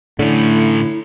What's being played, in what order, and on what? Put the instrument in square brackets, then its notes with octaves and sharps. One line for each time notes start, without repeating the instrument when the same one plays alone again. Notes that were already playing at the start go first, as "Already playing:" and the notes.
[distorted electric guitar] A2 C#4 [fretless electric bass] D3 [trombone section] A3 [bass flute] E4